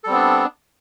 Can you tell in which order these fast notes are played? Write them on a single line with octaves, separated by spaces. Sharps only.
A4 G3 C4 B3 D4